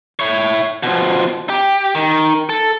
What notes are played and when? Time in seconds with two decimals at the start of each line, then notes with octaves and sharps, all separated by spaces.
0.20 E4 C#5
0.83 B2 F3
1.49 G4
1.95 D#3
2.49 A4